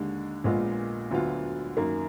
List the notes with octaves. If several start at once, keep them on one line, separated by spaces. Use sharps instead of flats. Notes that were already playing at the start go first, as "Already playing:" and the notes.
Already playing: D#2 D3 G#3
A#1 A#2 G#3 B3 F4
D2 D3 F#3 B3 F4
F#2 D#3 A#3